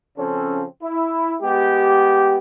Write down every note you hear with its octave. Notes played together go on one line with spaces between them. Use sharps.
C#3 F3 C4 C#4 A4
E4
G#3 B3 G4